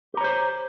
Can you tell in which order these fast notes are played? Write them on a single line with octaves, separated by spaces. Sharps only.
G4 A#5 C#5 C5